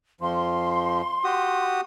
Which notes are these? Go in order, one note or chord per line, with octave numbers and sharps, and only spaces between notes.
F2 F3 C6
F#4 G4 D#6